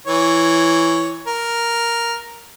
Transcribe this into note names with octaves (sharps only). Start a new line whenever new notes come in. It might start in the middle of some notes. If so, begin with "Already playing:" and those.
E3 C#5
A#4